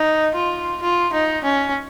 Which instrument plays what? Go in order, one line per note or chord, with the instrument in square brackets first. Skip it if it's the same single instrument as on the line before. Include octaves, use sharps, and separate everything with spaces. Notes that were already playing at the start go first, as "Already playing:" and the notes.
Already playing: [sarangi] D#4
F4
F4
D#4
C#4